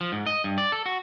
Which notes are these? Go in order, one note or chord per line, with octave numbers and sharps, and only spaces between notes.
F3
G#2
D#5
G2
D5
A4
F#4